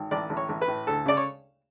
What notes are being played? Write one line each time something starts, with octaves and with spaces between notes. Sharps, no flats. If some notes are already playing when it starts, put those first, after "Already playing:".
Already playing: G#1
A1 D5
A1
C#5
A1
B4
A2
D2 A4
C#3 D5
C#5